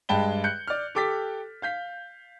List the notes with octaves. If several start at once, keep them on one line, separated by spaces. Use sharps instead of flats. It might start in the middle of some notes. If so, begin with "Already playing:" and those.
G2 G#3 G5 A5 B5 G7
F#6 G6 C#7
D5 F6
G4 A4 D6 A6 B6
F5 G6 B6